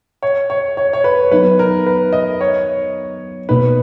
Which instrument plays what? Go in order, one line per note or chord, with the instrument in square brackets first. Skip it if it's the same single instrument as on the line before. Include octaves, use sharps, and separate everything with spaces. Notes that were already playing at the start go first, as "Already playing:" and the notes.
[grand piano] C#5
C#5
C#5
C#5
B4
[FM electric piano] F#3 B3 D#4 [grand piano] B4
[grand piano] A#4
B4
D#5
C#5
[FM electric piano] B2 A#3 D#4 [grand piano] B4